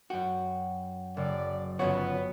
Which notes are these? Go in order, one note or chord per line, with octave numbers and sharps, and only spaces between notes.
F#2 F#4 G5
F#1 D5
G1 C#3 F3 B3 F#4 C#5